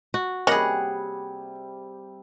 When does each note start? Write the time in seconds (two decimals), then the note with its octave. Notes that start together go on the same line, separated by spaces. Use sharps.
0.14 F#4
0.47 C3 G3 A#3 C#4 G#4 D#5 F#5